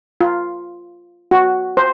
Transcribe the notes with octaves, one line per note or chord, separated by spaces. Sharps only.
F4
F#4
C5